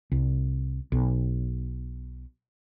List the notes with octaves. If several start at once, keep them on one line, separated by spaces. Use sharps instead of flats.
C2
B1